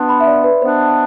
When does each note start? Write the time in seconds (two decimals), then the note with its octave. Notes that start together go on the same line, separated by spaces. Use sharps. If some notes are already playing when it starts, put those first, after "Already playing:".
Already playing: B2 B3 D4 C6
0.09 B5
0.20 E5
0.27 D5
0.44 B4
0.62 B2 B3 D4 C5